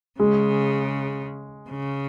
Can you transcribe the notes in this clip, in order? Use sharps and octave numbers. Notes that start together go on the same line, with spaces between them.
C#3 G#3
C#3